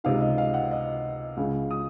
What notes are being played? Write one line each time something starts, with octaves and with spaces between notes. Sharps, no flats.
C#2 C3 D#3 F5
D#5
F5
F#5
D#5
C#2 C#3 F5
D#6